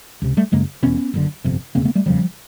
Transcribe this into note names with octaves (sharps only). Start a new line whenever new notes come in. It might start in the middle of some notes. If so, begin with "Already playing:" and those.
C#2 C3
G3 A3
F#1 F#2 C#3 G#3 A#3
E1 E2 B2 B3 C#4
F#1 F#2 D3
G1 F2 C3
E1 D2 C#3 A#3 C4
A3 B3
G3 A3
F#1 E2 C#3 F3 G3